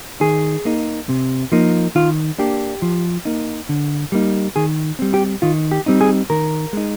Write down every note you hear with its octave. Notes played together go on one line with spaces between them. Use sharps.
D#3 G#4
A#3 D#4
C3
F3 A#3 D#4
D#3 F4
A#3 D4 G4
F3
A#3 D#4
D3
G3 A#3 D#4
D#3 G#4
G3 C4
G4
D#3 F4
G4
G3 C4 D#4
G#4
D#3 A#4
G#3 D#4